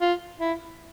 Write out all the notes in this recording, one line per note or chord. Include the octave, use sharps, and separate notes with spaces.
F4
E4